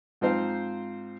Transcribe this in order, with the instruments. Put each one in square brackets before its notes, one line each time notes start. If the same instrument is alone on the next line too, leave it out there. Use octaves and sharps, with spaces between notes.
[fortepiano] G#2 F3 C4 D#4 C5 F5